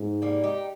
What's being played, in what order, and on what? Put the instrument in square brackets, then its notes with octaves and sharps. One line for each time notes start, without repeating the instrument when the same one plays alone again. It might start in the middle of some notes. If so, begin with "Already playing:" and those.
Already playing: [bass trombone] G#2
[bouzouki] G3 A#3
D#4 G4